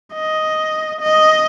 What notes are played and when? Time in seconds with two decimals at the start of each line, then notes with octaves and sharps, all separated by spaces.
0.15 D#5
1.01 D#5